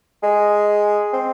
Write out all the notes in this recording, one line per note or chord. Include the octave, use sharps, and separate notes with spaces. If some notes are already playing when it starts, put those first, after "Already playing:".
G#3
C4